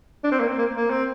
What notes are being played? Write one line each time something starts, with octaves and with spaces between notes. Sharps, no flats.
D4
C4
A#3
C4
A#3
A#3
C4